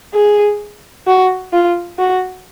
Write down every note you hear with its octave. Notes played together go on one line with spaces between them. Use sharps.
G#4
F#4
F4
F#4